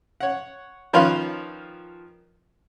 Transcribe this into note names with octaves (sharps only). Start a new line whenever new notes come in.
C#5 F#5
D#3 F3 C#4 B4 F5 C6